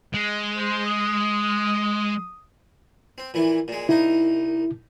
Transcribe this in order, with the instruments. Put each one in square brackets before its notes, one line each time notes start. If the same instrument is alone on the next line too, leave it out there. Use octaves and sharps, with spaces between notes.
[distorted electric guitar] G#3
[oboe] C5
D#6
[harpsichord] C4
A#2 E3 E4
A#2 G#3
[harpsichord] C2 A#3 D#4 [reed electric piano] E4